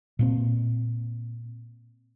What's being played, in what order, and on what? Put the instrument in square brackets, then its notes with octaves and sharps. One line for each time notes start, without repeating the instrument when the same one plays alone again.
[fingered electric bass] A#2 A#3 C4